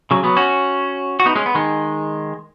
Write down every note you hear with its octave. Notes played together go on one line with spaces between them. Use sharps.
C#3 F#3
F#3 B3
C#4 F#4
F#4
B3 D#4
G#3 C#4
B3
D#3 G#3